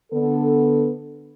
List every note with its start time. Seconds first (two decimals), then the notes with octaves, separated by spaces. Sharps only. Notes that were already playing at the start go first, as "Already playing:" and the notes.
0.12 D3 B3 A4